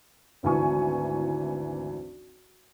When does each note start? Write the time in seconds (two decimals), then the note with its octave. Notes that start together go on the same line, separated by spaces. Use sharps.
0.43 G#1 D2 E3 G#5 C#6